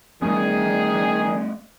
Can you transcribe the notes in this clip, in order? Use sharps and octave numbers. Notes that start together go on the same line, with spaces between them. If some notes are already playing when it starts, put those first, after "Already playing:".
D#3 G3 A3 B3 G#4